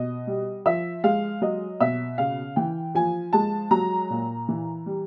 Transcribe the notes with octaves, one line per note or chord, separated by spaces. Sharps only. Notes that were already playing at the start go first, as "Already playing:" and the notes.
Already playing: B2 D#5
G3
F3 E5
G#3 F5
F#3 D#5
B2 E5
C#3 F5
E3 G5
F3 G#5
G#3 A5
F#3 A#5
A#2
E3
G3